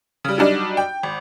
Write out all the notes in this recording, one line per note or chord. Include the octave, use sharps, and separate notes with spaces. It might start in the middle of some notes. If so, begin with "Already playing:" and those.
C#3 G3
F#3 G3 D4 D#4
G5
G#1